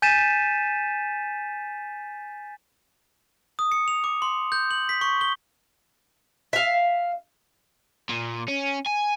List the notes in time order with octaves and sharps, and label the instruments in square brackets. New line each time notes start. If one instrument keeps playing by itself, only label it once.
[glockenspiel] G#5 G6 A6 B6 D#7 E7
D#6
C#7
F7
D6
C6
G6
F#7
B6
C#6
G7
[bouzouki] E5 F5
[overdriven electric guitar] A#2
C#4
G#5